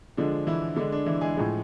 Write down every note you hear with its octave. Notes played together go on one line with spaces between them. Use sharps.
D3 F3 G#3 D4
E3 E4
D3 G#3 D4
D4
E3 E4
G#3 G#4
A2 F3 G#3